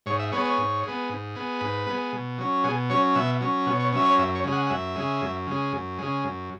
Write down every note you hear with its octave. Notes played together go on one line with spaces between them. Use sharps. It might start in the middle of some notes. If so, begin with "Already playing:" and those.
G#2 C#5
E5
G#3 B3 C#5
C#5
G#2
G#3 B3
G#2
G#3 B3
G#2 B4
G#3 B3
B2
F#3 C#4
B2 G#4
F#3 C#4 C#5
B2 E5
F#3 C#4
B2 C#5
C#5
F#3 C#4 E5
C#5
F#2 E5
C#5
C#3 G#3
F#5
F#5
F#2 E5
C#3 G#3
F#2
C#3 G#3
F#2
C#3 G#3
F#2